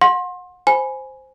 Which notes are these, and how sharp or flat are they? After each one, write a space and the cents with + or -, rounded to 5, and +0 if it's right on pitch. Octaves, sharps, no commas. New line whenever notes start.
F#5 -35 C6 +25
C5 +0 G#5 +5 B5 +0